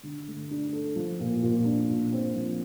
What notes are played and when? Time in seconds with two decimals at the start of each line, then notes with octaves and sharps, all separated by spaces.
0.03 D3
0.28 A3
0.50 D4
0.73 A4
0.96 F3
1.20 A#2
1.43 A#2
1.65 D4
1.89 A#2
2.12 C4
2.35 F3